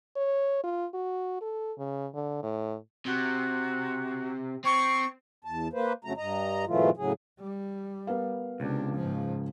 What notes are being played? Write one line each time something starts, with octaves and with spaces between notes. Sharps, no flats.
C#5
F4
F#4
A4
C#3
D3
A2
C3 F#4
C4 C#6
E2 A5
A#3 B4 C5
F2 C#3 F#3 A3 A#5
G2 D#5 A#5
G#2 B2 E3 F#3 A3 F4
A2 C#3 F#3 G#4
G3
B3 A#4 F5
C#2 C3 D4
G#2 F3